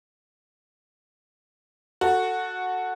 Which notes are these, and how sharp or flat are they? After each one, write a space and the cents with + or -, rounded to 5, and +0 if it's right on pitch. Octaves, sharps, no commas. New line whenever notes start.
F#4 -10 A4 +15